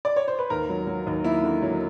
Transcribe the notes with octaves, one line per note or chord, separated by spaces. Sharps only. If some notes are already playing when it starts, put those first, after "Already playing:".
D5
C#5
C5
B4
D#2 A#4
F#3
F#3
D#2
A#3 E4
D3
F#3